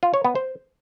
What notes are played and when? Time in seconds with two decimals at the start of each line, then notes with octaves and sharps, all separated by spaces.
0.03 F4
0.14 C#5
0.25 B3
0.35 C5